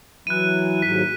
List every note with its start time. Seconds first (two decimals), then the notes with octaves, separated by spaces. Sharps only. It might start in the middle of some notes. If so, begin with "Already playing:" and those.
0.27 E3 F#3 E4 F#6 D#7
0.82 D#2 G#2 F#3 B6